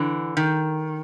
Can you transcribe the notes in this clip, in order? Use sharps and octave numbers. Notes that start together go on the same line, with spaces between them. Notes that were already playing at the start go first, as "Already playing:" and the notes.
Already playing: D3 E3
D#3